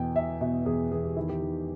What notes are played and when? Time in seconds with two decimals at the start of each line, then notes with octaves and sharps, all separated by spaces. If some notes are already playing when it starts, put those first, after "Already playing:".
Already playing: E2 B2 G5
0.15 B2 E5
0.41 B2 E5
0.66 E2 G#4
0.91 E2 G#4
1.04 G4
1.17 D#3 E4
1.29 G4
1.42 D#3